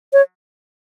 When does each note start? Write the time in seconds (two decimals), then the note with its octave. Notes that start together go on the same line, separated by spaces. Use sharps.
0.13 C#5